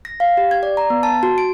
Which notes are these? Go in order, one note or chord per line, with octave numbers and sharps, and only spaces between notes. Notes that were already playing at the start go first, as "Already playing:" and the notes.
A#6
F5
G4
G#6
D5
A#5
B3
A5
F#4
D7